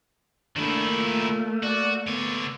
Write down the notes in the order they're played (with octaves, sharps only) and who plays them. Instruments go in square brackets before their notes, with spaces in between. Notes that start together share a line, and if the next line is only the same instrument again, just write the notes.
[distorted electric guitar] D#3 E4 [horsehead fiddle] A3 A#3 [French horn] D4
[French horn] A#2
[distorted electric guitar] F#4 [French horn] D5
[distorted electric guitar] D3 C#5 [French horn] B3